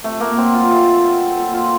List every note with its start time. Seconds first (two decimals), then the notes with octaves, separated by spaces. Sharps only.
0.04 C3 A3
0.20 A#3
0.37 F#3 C4
0.54 F4
0.70 C3 A4
1.03 F#3
1.37 A#2 A4
1.54 F4